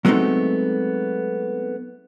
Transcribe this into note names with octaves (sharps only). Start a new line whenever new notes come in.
F#3 G#3 A3 B3 C4 D#4